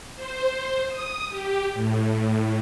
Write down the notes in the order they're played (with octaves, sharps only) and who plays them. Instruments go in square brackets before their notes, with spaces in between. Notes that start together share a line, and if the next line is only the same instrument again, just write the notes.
[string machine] C5
D#6
G4
A2